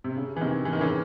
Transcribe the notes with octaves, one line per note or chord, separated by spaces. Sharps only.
C3
C#3
E3
C3 D#3
E3
D#3
C#3 E3